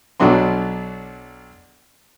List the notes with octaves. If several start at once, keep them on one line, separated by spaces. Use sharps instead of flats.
B1 B2 F#3 D4 C6